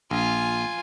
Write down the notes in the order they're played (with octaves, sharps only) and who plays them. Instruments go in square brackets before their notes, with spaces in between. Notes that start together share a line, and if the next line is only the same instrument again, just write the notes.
[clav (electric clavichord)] A#1 [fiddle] F4 G#5